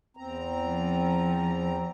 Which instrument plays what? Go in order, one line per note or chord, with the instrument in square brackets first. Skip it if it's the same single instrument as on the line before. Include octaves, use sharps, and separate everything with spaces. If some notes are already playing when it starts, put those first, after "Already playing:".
[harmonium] E2 C4 A#5
[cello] F3